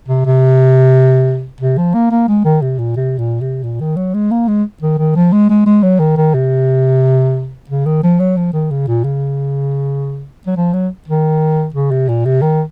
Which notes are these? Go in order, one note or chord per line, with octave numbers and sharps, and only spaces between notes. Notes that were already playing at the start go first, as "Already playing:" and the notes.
C3
C3
C3
F3
A#3
A#3
G#3
D#3
C3
A#2
C3
A#2
C3
A#2
D#3
F#3
G#3
A#3
G#3
D#3
D#3
F3
G#3
G#3
G#3
F#3
D#3
D#3
C3
C#3
D#3
F3
F#3
F3
D#3
C#3
A#2
C#3
F#3
F3
F#3
D#3
C#3
C3
A#2
C3
D#3